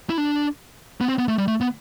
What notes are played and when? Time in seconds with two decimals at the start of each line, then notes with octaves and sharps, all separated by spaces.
0.09 E4
0.18 D4
1.01 B3
1.08 C4
1.18 B3
1.28 A3
1.38 G3
1.48 A3
1.61 B3